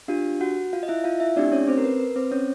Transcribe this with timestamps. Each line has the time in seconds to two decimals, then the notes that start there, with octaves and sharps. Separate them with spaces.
0.08 D4 F4 G4 F5
0.41 F#4 F#5
0.73 F4 F5
0.83 D#5
0.88 E4 E5
1.04 F4 F5
1.20 E4 E5
1.36 A3 C4 D4 D#4 G4 D5
1.52 C#4 C#5
1.68 C4 C5
1.78 A#4
1.84 B4
2.00 B4
2.16 C4 C5
2.31 C#4 C#5